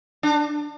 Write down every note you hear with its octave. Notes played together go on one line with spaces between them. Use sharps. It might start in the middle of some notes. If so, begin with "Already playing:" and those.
D4